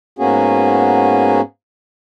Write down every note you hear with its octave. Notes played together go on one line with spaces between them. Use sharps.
G#2 A#3 B3 C#4 F#4 G#4